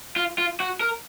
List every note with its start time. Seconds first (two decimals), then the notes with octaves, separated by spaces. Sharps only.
0.16 F4
0.38 F4
0.60 F#4
0.81 A#4